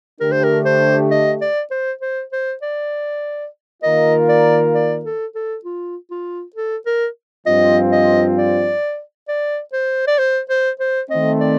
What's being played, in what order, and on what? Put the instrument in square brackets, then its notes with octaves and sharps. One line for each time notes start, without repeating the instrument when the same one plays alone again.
[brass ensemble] D3 A3 D4 G4 [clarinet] A#4
[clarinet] C5
A#4
C5
D#5
D5
C5
C5
C5
D5
[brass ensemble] D#3 A#3 F4 A#4 [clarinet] D#5
[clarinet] D5
D5
A4
A4
F4
F4
A4
A#4
[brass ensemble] G2 F3 C4 F4 [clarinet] D#5
[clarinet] D#5
D5
D5
C5
D5
C5
C5
C5
[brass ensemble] D#3 A3 C4 [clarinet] D#5
[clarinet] D5